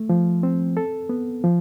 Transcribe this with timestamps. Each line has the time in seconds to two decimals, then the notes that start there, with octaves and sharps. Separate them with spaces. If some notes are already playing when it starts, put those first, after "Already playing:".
Already playing: A3
0.09 F3
0.43 C4
0.77 A4
1.09 B3
1.44 F3